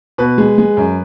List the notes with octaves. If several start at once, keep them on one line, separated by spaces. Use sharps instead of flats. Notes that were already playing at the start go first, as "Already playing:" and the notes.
B2 B4
G#3
G#3
F#2